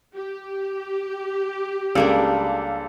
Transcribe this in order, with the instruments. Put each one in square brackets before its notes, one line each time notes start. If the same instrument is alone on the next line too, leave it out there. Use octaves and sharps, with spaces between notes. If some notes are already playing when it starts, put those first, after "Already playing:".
[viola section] G4
[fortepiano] C#2 G#4 A4 [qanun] G3 A#3 D4